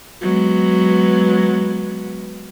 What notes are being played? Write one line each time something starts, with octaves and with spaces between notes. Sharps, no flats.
F#3 G#3 B3